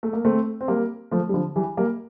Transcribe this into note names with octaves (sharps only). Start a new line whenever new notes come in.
A3
A#3
A3 C4
C4
G3 A#3
F3 A3
G3
D3 F3
E3 G3
G3 A#3